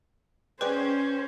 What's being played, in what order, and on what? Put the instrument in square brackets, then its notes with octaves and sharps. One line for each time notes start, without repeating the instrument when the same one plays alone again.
[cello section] C#4 [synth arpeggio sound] G#4 D5 G5 [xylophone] B4 [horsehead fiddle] C5